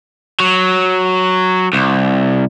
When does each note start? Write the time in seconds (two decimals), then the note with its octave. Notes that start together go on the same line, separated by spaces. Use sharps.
0.40 F#3
1.73 C2